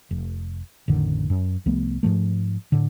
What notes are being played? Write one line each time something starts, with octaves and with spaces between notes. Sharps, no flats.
F1
A1 F2 D3 D#3
F#2
C2 F3 A3 B3
G#2 F3 A3
A2 D3